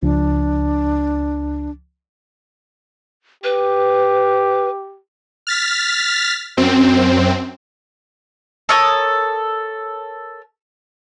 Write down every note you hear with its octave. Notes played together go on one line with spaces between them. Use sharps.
C#2 F3 D4
G4 B4
F6 A6 B6
F#2 C4
A4 A#4 C#5 D#6